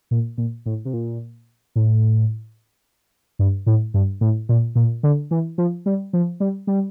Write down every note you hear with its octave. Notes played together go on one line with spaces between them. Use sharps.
A#2
A#2
A2
C3
A#2
A2
G2
A2
G2
A2
A#2
A#2
D3
E3
F3
G3
F3
G3
G3